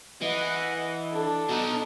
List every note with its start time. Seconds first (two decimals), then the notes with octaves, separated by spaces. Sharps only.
0.22 E3 D#5 F#5
1.12 D4 A4
1.49 B2 D#4